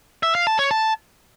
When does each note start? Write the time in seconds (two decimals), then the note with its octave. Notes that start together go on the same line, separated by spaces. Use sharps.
0.23 E5
0.35 F5
0.47 A5
0.59 C#5
0.71 A5